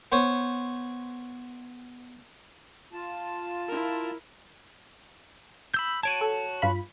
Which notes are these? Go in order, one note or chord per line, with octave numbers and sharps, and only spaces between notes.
B3 C5 C#5
F4 A5
E4 A#4
B5 E6 G6
F#4 C#5 A5 G#6 D7 D#7
A4
G2 F4 B5